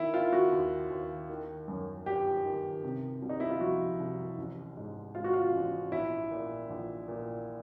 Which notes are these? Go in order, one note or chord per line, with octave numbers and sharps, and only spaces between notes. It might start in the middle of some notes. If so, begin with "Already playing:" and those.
Already playing: D#3 E4
D#3 F4
F#4
D#2
D#2
D#3
F#2
G1 G4
D#3
C3
C2
D#4
E4
F4
F3 F#4
C2
A1
G#2
G#2 F4
F#4
F4
A1
A#1 E4
A#2
A#1
A#2